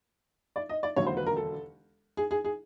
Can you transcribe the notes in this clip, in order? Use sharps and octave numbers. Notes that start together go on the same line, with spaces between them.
D5
D#5
D5
E1 D#2 D3 F#3 C#5
C5
B4
A#4
A4
G#4
G#4
G#4